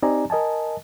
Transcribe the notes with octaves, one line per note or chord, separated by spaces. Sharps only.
C4 D#4 G4 D5 G#5 A#5
A#4 D#5 G#5 A5